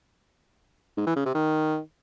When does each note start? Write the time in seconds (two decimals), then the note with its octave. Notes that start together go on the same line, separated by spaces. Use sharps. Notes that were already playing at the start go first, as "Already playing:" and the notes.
0.97 G#2
1.07 E3
1.16 C#3
1.25 C3
1.35 D#3